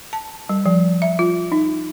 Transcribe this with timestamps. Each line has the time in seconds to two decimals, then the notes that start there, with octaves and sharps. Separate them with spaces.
0.13 A5
0.49 G3
0.66 F3
1.02 E5
1.19 F4
1.52 D#4